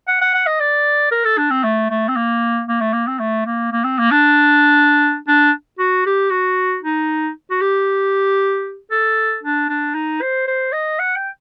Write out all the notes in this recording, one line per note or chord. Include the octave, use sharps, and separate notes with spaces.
F#5
F#5
F#5
D#5
D5
A#4
A4
D4
C4
A3
A3
C4
A#3
A#3
A3
A#3
C4
A3
A#3
A#3
C4
A#3
D4
D4
F#4
G4
F#4
D#4
F#4
G4
A4
D4
D4
D#4
C5
C5
D#5
F#5
G5